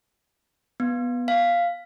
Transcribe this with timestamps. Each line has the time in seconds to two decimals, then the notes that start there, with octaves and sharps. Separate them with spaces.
0.80 B3
1.28 F5